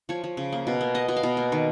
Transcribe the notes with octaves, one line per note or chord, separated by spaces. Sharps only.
F3 C#5
F3
C#3
A#3
B2
A#3
B3 D#5
B2
F5
B2
A#3
D#3